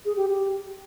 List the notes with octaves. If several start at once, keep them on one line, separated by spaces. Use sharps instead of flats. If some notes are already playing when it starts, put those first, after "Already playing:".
G#4
G4
G4